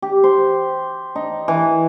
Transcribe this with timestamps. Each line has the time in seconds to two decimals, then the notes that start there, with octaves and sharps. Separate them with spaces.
0.02 G4
0.24 C5
1.16 D#4
1.48 E3